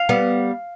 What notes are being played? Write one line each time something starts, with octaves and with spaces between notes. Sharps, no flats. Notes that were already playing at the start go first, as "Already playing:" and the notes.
Already playing: F5
G3 B3